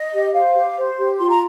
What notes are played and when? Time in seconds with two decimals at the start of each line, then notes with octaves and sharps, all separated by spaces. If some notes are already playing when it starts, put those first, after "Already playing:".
Already playing: D#5
0.12 G4
0.33 C5 F5
0.54 G4
0.76 C5
0.98 G4
1.18 F4 C6
1.29 A#5